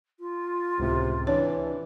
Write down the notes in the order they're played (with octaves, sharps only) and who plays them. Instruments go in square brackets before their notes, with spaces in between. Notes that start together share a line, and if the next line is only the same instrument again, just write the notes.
[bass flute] F4
[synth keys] C#2 A2 [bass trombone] C3
[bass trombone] E3 [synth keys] D4 [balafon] C#5